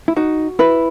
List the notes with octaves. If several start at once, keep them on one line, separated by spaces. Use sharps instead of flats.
E4
D#4 F#4
E4 B4